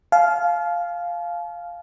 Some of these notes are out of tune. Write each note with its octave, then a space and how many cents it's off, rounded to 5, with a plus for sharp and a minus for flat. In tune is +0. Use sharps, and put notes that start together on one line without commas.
F5 +0 A5 -45